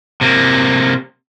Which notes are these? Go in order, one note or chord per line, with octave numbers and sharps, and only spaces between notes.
C3 A#3